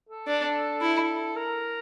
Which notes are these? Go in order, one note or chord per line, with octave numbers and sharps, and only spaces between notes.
A4
D4
E4
A#4